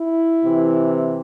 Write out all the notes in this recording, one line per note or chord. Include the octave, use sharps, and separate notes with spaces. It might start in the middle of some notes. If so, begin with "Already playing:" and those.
Already playing: E4
C3 E3